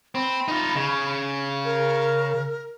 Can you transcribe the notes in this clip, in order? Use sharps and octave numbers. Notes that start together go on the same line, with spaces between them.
C4 B5
D#4 F4
C#3
A#4